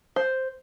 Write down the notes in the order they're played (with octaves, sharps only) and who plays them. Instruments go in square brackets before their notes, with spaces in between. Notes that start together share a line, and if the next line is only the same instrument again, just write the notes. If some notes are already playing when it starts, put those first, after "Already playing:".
[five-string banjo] C5